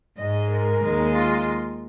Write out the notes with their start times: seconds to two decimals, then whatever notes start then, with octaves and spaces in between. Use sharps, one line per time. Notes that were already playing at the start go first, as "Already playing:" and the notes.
0.18 G#2 G#3 D#5
0.51 A#4
0.82 D#2 D#3 G#3
1.15 F4